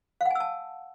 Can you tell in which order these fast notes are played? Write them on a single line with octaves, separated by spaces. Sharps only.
F5 F#5 G#5 E6 A5